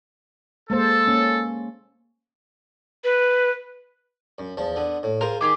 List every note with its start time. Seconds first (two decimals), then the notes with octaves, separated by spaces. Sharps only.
0.70 G#3 A#3 A4 C5
1.07 A#3 C#4
3.04 B4
4.38 F#2
4.57 E2 F3 A5
4.76 D3 B3
5.03 A2
5.21 F4 G#4 A#4 C5
5.41 D#3 G4 G#4 C6 D6